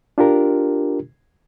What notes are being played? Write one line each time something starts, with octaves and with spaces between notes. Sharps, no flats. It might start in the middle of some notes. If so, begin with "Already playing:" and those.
D4 F4 G4 A#4